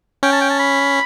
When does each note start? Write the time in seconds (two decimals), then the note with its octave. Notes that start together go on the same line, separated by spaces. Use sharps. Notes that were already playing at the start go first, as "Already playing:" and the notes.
0.23 C#4 G5
0.32 A5
0.41 G5
0.50 A5
0.59 B5